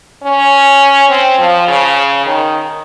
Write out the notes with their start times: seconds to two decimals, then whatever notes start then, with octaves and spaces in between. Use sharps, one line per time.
0.23 C#4
1.09 C4
1.39 F3
1.68 C#3
2.26 D#3